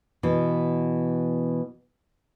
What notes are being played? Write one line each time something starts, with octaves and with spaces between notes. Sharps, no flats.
B2 E3